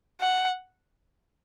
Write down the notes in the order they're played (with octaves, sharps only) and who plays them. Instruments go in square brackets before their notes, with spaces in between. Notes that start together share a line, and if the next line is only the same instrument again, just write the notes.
[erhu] F#5